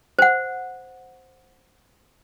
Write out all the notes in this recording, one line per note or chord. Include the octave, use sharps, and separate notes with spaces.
C5 F#5